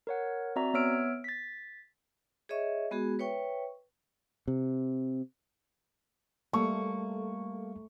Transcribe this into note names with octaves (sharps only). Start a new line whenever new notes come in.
A#4 C#5 F#5
C4 F#4 D5 E5 A#5
B3 C#5 E5 E6 F6 D7
A6 B6
G#4 C#5 D#5 E5 C#6
G#3 B3 F#4 G#4
B4 C#5 E5 G5 C#6
C3
G3 A3 A#3 A4 C#6